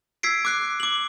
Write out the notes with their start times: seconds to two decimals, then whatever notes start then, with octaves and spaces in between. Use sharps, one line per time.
0.23 E6 G#6 B6 C7 D7
0.45 D6 F#6 C7
0.80 D6 F#7